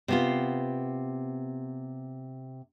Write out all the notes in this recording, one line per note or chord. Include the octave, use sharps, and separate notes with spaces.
C3 B3 F4